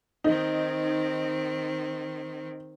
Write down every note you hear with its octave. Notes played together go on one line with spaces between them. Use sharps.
D#3 C4 D#4